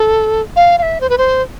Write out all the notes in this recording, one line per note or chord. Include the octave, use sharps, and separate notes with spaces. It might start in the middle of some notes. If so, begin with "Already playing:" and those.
Already playing: A4
F5
F5
E5
C5
B4
C5